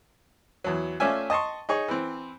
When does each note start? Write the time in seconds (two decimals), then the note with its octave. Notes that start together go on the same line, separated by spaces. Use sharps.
0.64 E2 F#3
1.00 A3 C#4 F4 D5 E5 G#5
1.30 D#5 A5 C6 C#6
1.69 D#4 G#4 C#5
1.88 E3 C4